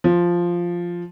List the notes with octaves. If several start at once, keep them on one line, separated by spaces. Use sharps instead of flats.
F3